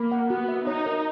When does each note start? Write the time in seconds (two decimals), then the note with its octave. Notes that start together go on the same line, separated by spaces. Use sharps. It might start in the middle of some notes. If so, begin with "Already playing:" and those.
Already playing: A#3 B5
0.12 F#5
0.30 B3 F#4
0.49 E5
0.67 D#4 C#5
0.86 A#4